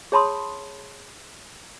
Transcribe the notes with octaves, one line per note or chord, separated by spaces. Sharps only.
G#4 C#5 A5 B5 C6 D#6